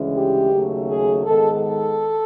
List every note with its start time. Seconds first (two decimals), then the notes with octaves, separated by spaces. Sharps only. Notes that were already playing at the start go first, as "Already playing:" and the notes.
Already playing: D2 C#3 E3 G#3 C#4
0.15 G4
0.51 D#2 C#3 F#3 A3
0.88 G#4
1.24 G#2 D#3 G#3 B3 A4
1.61 A4